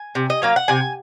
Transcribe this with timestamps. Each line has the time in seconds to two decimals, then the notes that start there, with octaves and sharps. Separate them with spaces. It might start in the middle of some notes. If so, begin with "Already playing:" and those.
Already playing: G#5
0.15 C3
0.30 D#5
0.42 F#3 A#3 F5
0.56 F#5
0.68 C3 G#5